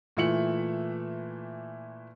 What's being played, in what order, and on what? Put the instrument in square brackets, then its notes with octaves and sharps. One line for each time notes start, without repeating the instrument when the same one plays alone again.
[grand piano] A#2 E3 A3 E5 C#7 F#7